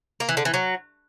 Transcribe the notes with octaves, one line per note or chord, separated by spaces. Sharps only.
A#3
E3
D3
E3
F#3